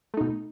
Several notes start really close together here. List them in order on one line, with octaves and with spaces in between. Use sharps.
A3 D#4 B2